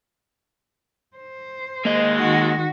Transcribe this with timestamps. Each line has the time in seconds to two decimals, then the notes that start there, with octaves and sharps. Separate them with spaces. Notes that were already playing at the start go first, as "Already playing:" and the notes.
1.17 C5
1.85 G#3 A#3 D#5
2.15 D#3 F#4